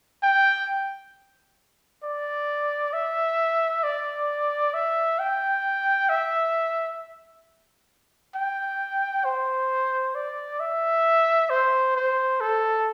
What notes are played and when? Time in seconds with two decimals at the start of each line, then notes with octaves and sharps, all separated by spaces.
0.23 G5
2.03 D5
2.93 E5
3.83 D5
4.74 E5
5.19 G5
6.09 E5
8.35 G5
9.25 C5
10.15 D5
10.60 E5
11.50 C5
11.96 C5
12.41 A4